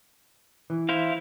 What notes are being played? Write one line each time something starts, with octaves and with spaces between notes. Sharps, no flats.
E3
E4 C5 F5